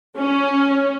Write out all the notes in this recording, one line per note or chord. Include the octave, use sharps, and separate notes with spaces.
C#4